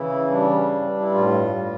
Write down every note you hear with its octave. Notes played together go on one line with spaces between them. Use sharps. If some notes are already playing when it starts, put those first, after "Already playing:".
Already playing: C#3 E3 E4
G3 D4
G2
E4
A2 F4
G3